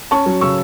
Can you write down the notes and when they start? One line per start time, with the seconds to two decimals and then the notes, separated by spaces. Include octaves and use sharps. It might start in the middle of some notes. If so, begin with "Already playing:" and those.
0.11 C#4 A5 C#6
0.26 F#3
0.41 C#3 C#6 E6